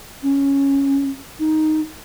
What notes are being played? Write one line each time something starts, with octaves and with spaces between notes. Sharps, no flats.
C#4
D#4